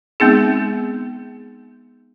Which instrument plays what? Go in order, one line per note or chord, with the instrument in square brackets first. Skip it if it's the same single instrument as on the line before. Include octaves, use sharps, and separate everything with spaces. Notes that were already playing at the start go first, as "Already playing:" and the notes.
[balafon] G#3 B3 C4 D#4 G#4